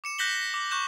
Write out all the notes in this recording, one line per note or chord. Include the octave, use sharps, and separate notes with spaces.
D6 C#7 E7
F#6 G6 A#6 B6 F#7 G7
A#6
D6
C#6 F#6 G6 E7